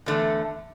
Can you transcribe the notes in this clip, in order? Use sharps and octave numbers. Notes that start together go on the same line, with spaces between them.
E2 D3 A3